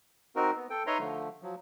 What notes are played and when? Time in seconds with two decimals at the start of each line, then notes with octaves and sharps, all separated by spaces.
0.36 C4 D#4 F#4 A#4
0.56 B3
0.70 A4 G5
0.87 D#4 B4 C#5 E5 A#5 C6
1.00 D3 F3 A3
1.43 F3 F#3